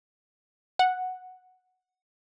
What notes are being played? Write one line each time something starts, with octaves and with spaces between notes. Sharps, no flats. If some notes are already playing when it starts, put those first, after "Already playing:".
F#5